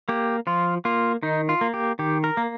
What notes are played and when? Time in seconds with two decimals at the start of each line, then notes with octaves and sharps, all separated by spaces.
0.09 A#3 G4
0.47 F3 F4
0.85 A#3 F4
1.23 D#3 D#4
1.49 F4
1.61 A#3
1.74 G4
1.99 D#3 G4
2.24 A#4
2.37 A#3